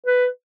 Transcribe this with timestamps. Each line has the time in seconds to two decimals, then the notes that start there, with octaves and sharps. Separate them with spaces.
0.07 B4